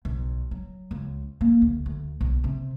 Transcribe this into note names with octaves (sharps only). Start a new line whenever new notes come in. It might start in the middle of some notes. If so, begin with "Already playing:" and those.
B1
F#3
C#2
A#3
D2
D2
B1
C3